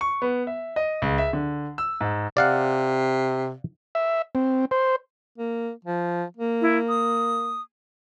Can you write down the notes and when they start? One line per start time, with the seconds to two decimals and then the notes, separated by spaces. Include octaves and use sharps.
0.01 C#6
0.22 B3
0.47 E5
0.76 D#5
1.02 C#2
1.18 E5
1.33 D3
1.78 E6
2.01 G#2
2.37 C3 D5 F5 F#5
3.95 E5
4.35 C4
4.71 C5
5.38 A#3
5.85 F3
6.37 A#3
6.61 E4
6.89 D#6